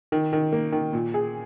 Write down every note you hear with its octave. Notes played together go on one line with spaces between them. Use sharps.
D#3
D#3
A#3
D#3
A#2
G#4